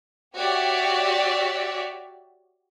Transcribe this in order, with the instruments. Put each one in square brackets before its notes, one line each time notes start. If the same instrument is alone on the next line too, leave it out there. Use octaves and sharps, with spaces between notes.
[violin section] F#4 G4 C#5 D5 E5